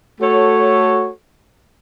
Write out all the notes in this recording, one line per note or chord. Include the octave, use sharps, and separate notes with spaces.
A3 F#4 A4 C#5